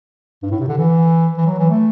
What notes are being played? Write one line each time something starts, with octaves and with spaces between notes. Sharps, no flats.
G2
A2
C3
D3
E3
E3
F#3
E3
A3